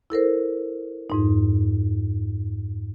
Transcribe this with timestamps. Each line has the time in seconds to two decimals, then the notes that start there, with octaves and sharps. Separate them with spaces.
0.10 E4 A4 A#4 C5
1.10 F2 G#2 D#4